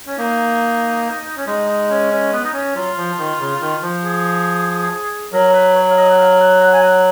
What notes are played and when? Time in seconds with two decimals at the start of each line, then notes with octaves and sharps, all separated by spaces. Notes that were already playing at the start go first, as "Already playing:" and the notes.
0.07 C#4
0.18 A#3 D#4
1.37 C#4
1.46 G#3 D#4
1.68 D#4
1.90 C#4
2.11 C#4
2.32 B3
2.45 D#4
2.53 C#4
2.75 F#3 F4
2.97 F3
3.18 D#3
3.39 C#3
3.61 D#3
3.82 F3
4.04 G#4
5.32 F#3 A#4
5.53 B4
5.75 C#5
5.91 F5
5.97 D#5
6.09 F#5
6.18 F5
6.40 F#5
6.61 F#5
6.73 G#5
6.82 F#5